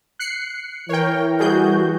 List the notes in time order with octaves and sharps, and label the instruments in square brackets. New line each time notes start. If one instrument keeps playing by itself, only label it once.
[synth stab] F#6 C7 C#7
[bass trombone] E3 [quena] A#4 [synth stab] C#5 G5
[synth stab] G3 G#4 G6 [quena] F#4